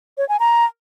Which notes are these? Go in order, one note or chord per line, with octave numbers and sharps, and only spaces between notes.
C#5
G#5
A#5